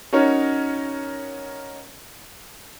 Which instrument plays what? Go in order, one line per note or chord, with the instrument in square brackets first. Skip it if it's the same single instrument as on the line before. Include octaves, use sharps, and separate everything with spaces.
[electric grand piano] C#4 D#4 F#4 A#4 C#5